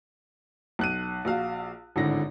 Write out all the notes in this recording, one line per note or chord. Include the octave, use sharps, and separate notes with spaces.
B1 F#6 D#7
A#1 F#4 F5
G#1 A2 D3 A#6